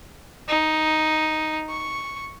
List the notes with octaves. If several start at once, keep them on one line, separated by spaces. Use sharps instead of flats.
D#4
C#6